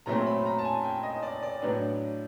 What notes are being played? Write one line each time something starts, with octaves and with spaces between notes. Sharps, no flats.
A#2 F#3 A3 C4 A#5
B5
A#5
A5
G#5
G5
D#5
D5
D5
A2 F#3 B3 D4